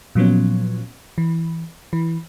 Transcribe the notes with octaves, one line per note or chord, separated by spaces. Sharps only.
A#2 F3 F#3 B3 C#4
E3
E3